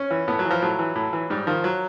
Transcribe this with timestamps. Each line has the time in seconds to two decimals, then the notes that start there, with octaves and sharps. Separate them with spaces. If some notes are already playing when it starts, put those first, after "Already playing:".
Already playing: C#4
0.11 E3
0.28 A2 B3
0.39 F#3
0.45 E3
0.51 F3
0.62 A2 F#3
0.79 E3
0.96 A2
1.13 E3
1.30 G#2 G3
1.47 D#3 F3
1.64 F#3